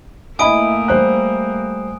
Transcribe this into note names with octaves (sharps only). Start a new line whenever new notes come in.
A3 A#3 E4 D#5 G#5 B5 D#6 D7
G3 C5 F#6